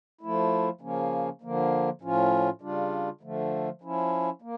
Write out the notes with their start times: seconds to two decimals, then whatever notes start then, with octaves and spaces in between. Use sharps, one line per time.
0.21 F3 A3 E4
0.81 C#3 F3 A#3 C#4
1.41 D3 F3 A#3
2.01 A2 F3 C#4 F4
2.62 C#3 G3 D4 F4
3.21 D3 F3 A3
3.82 F3 C#4 E4
4.42 A#3